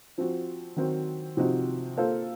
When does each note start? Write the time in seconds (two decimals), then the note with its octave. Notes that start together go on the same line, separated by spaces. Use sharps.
0.18 F3 C4 F#4
0.76 D#3 F#3 C4 F#4 C5
1.37 C3 F3 C4 D#4 F#4
1.96 A#3 F4 A4 C5 F5